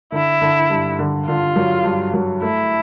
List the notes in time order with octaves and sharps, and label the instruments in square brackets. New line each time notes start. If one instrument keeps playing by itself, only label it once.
[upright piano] D3 [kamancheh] E4
[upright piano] D3
G2
D3
[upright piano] D3 [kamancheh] F4
[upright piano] F#3
G2
F#3
[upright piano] A3 [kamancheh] E4